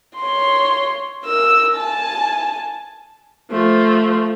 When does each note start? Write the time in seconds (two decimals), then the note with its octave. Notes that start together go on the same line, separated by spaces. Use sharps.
0.17 C#5 C6
1.25 A#4 E6
1.77 G#5 A5
3.51 F3 A3